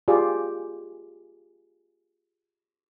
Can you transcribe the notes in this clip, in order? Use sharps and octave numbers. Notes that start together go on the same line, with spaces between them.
F4 G4 G#4 D5